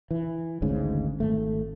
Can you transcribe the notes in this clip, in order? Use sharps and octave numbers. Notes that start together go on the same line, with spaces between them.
E3
G#1 D2 G#2 C#3
G#1 A3